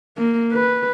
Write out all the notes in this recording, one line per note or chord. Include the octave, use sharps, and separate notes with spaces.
A#3
B4